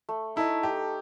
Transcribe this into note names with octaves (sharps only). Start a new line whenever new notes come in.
A3
D#4 E4 A4 D#5
A3 G4